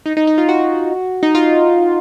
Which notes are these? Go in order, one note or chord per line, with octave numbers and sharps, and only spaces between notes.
D#4
D#4
D#4
F4
F#4
D#4
F4